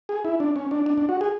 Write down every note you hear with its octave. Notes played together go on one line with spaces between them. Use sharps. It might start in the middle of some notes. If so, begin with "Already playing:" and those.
G#4
E4
D4
C#4
D4
D4
D4
F#4
G#4